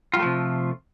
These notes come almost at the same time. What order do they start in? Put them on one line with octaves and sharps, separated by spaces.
F4 G3 A3 F3 C3